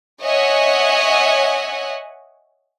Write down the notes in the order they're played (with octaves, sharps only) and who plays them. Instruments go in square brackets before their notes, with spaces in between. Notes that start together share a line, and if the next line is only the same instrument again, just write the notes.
[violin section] C#5 D#5 E5 F#5 G#5